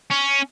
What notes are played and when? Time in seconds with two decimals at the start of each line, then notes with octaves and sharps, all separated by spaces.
0.10 C#4